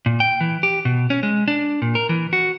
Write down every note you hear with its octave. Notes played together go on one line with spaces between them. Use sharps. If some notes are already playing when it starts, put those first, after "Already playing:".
A#2
G5
E3
G4
B2
C#4
G#3
D4
A#2
A#4
E3
F#4